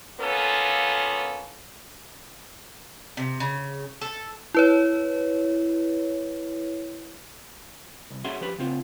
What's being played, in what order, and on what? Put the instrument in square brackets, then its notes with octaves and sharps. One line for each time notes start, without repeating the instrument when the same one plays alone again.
[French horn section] A#3 B3 C#4 F4 A4
[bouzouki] C3
C#3
A4
[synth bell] E4 B4 C#5
[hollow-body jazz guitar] C2
C#4 F#4 G#4 E5 F#5 C6
F3 G4 B4
C#3 C4 F4